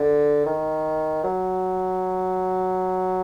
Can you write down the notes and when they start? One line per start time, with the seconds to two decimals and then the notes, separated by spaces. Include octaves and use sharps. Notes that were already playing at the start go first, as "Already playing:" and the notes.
Already playing: D3
0.46 D#3
1.23 F#3